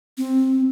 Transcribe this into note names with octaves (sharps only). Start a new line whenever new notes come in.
C4